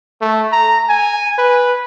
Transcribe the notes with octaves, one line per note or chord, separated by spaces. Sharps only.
A3
A#5
G#5
B4